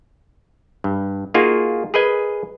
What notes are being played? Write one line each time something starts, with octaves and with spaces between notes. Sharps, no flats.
G2
A#3 D#4 F4 F#4 G#4 G#5
G#4 A#4 B4 D#5 G#5